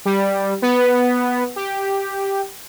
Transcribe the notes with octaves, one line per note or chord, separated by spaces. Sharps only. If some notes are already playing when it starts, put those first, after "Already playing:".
G3
B3
G4